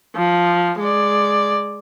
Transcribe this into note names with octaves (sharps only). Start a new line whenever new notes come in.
F3
G#3 D5